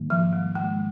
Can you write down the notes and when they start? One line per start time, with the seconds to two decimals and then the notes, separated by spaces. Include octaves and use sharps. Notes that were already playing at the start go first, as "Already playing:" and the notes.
Already playing: G#2 D#3 G3 A#3
0.10 F3
0.33 G3
0.55 G#3